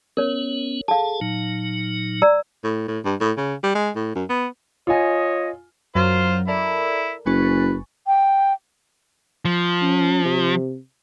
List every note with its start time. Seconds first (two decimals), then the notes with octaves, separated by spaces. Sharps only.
0.17 B3 C#4 A#4 C#5
0.88 G#4 A4 F5 A5
1.21 A#2 F#3 D#4
2.22 D5 A#5 E6
2.64 A2
2.88 A2
3.05 G2
3.20 A2
3.37 C#3
3.63 G3
3.75 G#3
3.95 A2
4.15 F#2
4.29 B3
4.87 F4 C#5 D#5 G#5
5.95 F#2 F#3 F4 C5 A#5
6.48 E4 A4 A#4 D5
7.26 F#1 B4 G#5 C#6 A6
8.07 G5
9.45 F3
9.82 C#4
10.25 C3